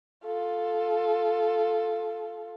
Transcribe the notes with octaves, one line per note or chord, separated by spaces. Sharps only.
F4 A4